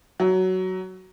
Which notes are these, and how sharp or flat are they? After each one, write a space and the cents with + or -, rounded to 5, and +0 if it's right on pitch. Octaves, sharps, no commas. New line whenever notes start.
F#3 +10